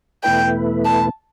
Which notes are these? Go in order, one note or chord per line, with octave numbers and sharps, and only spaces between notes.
E2 B2 A3 E4 B4 G5
A5